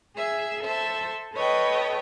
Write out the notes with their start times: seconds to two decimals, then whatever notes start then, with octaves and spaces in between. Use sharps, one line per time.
0.16 G#4 E5
0.63 A4 C5 E5 C6
1.34 A4 B4 C#5 D#5 G5